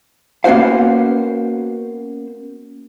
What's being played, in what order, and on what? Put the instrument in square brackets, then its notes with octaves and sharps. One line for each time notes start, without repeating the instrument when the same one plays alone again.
[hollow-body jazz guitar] A#3 B3 C#4 F#4 C5 F5